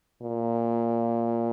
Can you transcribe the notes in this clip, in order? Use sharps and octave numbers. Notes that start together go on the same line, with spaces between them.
A#2